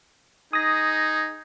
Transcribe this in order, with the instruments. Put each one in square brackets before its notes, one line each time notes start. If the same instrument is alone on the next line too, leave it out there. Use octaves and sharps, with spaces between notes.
[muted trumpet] D#4 [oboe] G#4 [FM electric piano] D#6 A#6